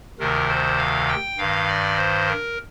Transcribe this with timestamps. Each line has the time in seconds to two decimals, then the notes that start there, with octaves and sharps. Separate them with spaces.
0.19 D2 C3 D#3 A#4
0.49 C5
0.78 F5
1.08 G5
1.38 G2 D#3 F5
1.68 D5
1.97 C5
2.27 A#4